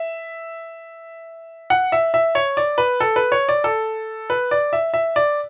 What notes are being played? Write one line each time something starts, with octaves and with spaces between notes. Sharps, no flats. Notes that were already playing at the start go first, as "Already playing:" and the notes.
Already playing: E5
F#5
E5
E5
C#5
D5
B4
A4
B4
C#5
D5
A4
B4
D5
E5
E5
D5